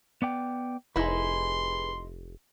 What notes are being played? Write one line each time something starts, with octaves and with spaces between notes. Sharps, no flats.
B3 D5 G5
F1 D#4 E4 G#4 B4 C6